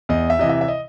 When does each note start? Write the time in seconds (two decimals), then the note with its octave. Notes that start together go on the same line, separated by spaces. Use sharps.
0.09 E2 D#5
0.30 E5
0.39 C3 E3 D#5
0.49 E5
0.61 E5
0.68 D#5